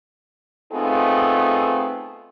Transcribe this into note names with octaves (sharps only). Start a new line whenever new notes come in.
A3 B3 C4 D#4 F4 G#4